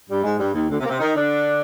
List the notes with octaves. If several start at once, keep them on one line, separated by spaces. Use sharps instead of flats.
G2 G3
G#2 G#3
G2 G3
D#2 D#3
D2 D3
C3 C4
A#3
C3 C4
D#3 D#4
D3 D4